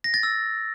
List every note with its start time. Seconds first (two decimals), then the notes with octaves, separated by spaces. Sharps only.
0.04 A#6
0.14 A6
0.23 E6